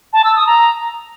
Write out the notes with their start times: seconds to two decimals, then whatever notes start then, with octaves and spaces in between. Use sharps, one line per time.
0.13 A5
0.24 E6
0.36 D#6
0.47 A#5